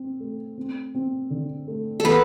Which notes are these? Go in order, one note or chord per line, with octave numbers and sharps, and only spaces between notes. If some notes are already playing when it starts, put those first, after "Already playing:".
Already playing: C4
A3
C4
C4
D3
A3
A4
E3 B3 B4